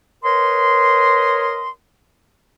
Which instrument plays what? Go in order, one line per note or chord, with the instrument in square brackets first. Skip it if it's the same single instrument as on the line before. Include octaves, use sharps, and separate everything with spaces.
[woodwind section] A#4 B4 C#5 D#5 C6